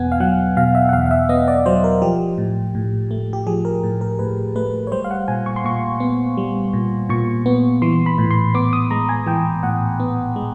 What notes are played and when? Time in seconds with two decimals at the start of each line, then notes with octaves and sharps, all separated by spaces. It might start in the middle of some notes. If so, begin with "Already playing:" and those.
Already playing: E2 B2 B3 F#5 G#5
0.12 F5
0.20 F#3 F#5
0.57 B2 F5
0.75 E5
0.89 F#5
0.93 E2 F5
1.06 F5
1.11 E5
1.29 B3 D#5
1.48 D5
1.66 F#3 C5
1.84 A#4
2.02 F3 G4
2.38 A2
2.75 A2
3.11 A3
3.33 G4
3.47 F3 G#4
3.65 A#4
3.84 A2
4.01 A#4
4.19 A2 B4
4.56 A3 B4
4.87 C#5
4.92 G3 C5
5.04 F5
5.11 F#5
5.28 A#2 G#5
5.46 C#6
5.56 C6
5.64 A#2 C#6
6.00 B3
6.37 G3
6.73 A#2
7.09 A#2 C#6
7.46 B3
7.82 E3 C6
8.06 B5
8.18 A2
8.31 C6
8.54 B3 D6
8.73 D#6
8.91 G#3 A#5
9.09 G#5
9.27 E3 G5
9.63 A2 F#5
10.00 B3
10.36 G#3